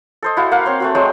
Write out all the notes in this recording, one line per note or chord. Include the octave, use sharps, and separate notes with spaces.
A4 C5 D#5
E4 F#4 F5
A#3 F5 F#5
C4 C#5 C6
A3 C4 F#4
F#3 G#3 C4 C5